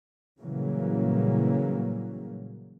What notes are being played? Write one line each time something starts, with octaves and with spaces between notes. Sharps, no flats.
A#2 C#3 E3 F#3 G3 A#3